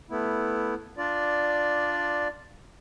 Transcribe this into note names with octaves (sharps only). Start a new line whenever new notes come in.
A3 B3 E4
D4 F4 D5